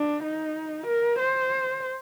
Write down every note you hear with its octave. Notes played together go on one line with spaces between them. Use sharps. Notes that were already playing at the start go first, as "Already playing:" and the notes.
Already playing: D4
D#4
A#4
C5